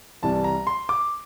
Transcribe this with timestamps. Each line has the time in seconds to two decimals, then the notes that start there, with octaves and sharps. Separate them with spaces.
0.23 C2 C3 E3 G3 A5
0.44 A#5
0.67 C6
0.89 D6